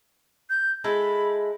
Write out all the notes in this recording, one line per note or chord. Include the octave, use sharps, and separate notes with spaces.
G6
G#3 E4 A4 B5